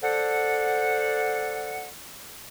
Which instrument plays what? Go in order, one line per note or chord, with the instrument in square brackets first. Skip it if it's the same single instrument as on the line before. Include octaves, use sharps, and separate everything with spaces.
[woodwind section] A4 C5 D5 F#5